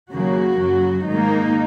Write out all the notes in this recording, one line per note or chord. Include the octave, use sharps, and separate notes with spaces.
D#2 C#3 F#3 A#3 F#4
F#2 C#3 F#3
G#2 D#3 A#3 D#4